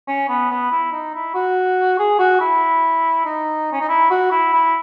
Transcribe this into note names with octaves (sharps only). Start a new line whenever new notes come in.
C#4
B3
B3
E4
D#4
E4
F#4
G#4
F#4
E4
D#4
C#4
D#4
E4
F#4
E4
E4